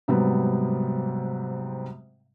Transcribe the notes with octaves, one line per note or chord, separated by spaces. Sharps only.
G#2 C3 F#3 G3 B3